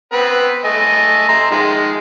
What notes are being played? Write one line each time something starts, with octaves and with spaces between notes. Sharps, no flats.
B3 C4 B4
A3 D#5 G#5
E5 A#5 C6
D#3 F3 G#3